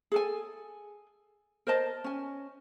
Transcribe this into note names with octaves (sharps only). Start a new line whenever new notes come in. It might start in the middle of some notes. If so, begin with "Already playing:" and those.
G#4 A4 G#5
A#4 C5 D#5 A5
C#4 G#5